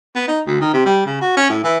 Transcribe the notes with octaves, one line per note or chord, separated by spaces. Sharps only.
B3
D#4
D2
D#3
C3
G3
C#3
F#4
C#4
A2
E3